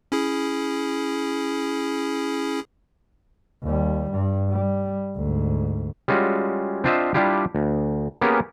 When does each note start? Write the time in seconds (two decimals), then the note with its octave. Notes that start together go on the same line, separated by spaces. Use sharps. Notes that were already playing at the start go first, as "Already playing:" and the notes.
0.12 C#4 E4 G#4
3.63 D#2 G3
4.11 G2
4.49 G3
5.16 D2 G#2
6.08 G3 G#3 C#4 F4 F#4
6.84 C4 D4 F4 C5 D#5 E5
7.14 G3 D4 E4 F4 G4
7.55 D2
8.21 A#3 B3 C#4 G4 G#4 A#4